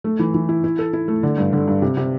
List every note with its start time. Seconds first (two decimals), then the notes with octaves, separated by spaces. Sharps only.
0.04 A3
0.19 E3
0.34 E3
0.49 E4
0.64 E4
0.79 A4
0.93 E4
1.08 A3
1.23 D3
1.38 G2
1.53 D3
1.68 G2
1.82 C3
1.97 C3